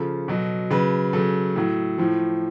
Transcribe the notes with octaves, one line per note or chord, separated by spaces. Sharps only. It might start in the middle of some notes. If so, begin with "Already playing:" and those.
Already playing: C#3 F3 A4
B2 F#3
C#3 F#3 B4
C#3 F#3 A4
A2 F#3
A2 F3